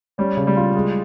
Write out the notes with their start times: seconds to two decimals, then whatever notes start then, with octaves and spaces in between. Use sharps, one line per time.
0.18 G3 C#4
0.37 C#3
0.47 G3
0.57 F4
0.75 G#3